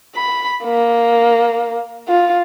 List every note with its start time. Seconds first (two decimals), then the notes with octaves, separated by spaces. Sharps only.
0.16 B5
0.65 A#3
2.08 F4